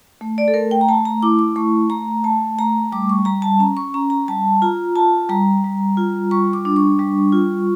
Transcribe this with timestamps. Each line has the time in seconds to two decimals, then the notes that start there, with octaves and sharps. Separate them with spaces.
0.21 A3
0.38 D5
0.48 A4
0.54 A3 A#4
0.71 G5
0.81 A#5
0.89 A3 A5
1.05 A#5
1.22 E4 D6
1.39 D6
1.56 A3 C#6
1.90 A3 A#5
2.24 A3 A5
2.58 A3 A#5
2.92 G3 D6
3.09 C#6
3.25 G3 A#5
3.42 A5
3.59 C#4 A#5
3.77 C#6
3.94 C#4 A#5
4.10 A#5
4.28 G3 A5
4.62 F4 A#5
4.96 F4 A5
5.29 G3 A#5
5.64 G3
5.97 F4
6.31 G3 C#6
6.53 D6
6.65 D4
6.76 C#6
6.99 G3
7.33 F4